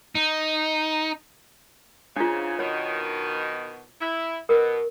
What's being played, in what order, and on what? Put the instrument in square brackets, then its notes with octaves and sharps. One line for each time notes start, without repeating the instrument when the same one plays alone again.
[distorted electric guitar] D#4
[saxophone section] G#2 C#3 [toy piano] D4 F4
[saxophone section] B2 D#3 [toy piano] C#5
[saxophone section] E4
[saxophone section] B2 [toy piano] A#4